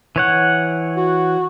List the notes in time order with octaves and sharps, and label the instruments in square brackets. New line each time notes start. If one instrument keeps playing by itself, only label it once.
[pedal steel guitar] E3 C#5 F#5
[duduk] F#4